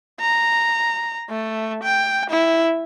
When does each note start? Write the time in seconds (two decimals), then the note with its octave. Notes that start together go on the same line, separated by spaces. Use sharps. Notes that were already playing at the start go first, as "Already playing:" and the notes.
0.20 A#5
1.30 A3
1.83 G5
2.30 E4